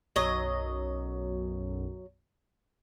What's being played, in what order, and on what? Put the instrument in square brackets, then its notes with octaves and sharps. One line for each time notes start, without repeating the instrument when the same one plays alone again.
[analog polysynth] B1 F#2 [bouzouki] F#3 D#5